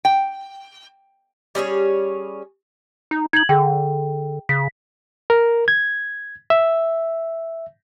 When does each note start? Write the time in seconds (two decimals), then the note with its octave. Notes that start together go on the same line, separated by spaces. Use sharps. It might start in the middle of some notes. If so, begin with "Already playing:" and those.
0.05 G5
1.55 G3 C#4 G#4 C#5
3.11 D#4
3.33 D#4 G#6 F#7
3.49 D3 G#4 G5
4.49 C#3 B6
5.30 A#4
5.68 G#6
6.50 E5